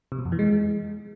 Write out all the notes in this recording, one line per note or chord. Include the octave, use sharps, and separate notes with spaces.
C3
B2
F2
E3
G#3